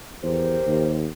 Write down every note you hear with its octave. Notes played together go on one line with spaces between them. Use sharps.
E2 G4 A#4 C5
D#2